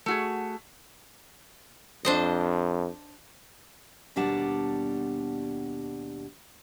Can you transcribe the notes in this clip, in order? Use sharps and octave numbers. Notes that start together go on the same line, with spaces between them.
A3 F#4 G#4
F2 D4 C5 D#5
D#2 B2 G3 D4 F#5 A5